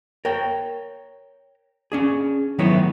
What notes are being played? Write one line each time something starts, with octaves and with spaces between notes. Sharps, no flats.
A#4 C#5 G5
C#4 D4 G#4
D#3 F#3 A3 B3 E4 C#5